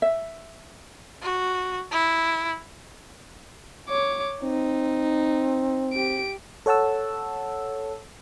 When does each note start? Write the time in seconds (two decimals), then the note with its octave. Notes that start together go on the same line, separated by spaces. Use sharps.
0.02 E5
1.22 F#4
1.91 E4
3.89 C#5 D6
4.43 C4 D#4
5.93 G4 D7
6.66 A4 C#5 F#5 A5 E6